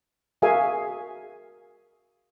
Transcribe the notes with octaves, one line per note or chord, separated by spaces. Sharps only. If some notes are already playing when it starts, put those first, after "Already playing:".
F#4 G#4 A#4 E5 F5 G#5